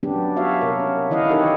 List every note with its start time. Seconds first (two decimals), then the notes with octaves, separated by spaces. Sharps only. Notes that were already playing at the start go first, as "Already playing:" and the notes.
0.03 F#3 B3 C#4 D4 G4
0.37 F#4 C#5 E5 F5
0.61 C3 A#4
0.80 C#4
1.10 D#3 E3 E4 D#5 F5 F#5
1.30 D#4 G4 A4 A#4 C#5 D#5